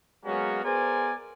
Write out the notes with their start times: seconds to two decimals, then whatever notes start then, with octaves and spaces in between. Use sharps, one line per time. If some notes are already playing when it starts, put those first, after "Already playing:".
0.26 F#3 G#3 A#3 B3 C#4 F#4
0.65 B3 G#4 A#4 C5 D5 G#5